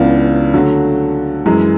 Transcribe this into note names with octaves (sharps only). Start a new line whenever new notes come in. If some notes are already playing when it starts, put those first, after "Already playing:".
Already playing: C#2 C#3 E3 B3 D4
D3 F#3 A3
F#2 E3 G#3